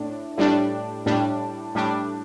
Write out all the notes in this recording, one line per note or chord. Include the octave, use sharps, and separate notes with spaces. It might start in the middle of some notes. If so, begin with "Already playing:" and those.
Already playing: A2 D4
A2 G3 D4
A2 G3 D4
A2 G3 D4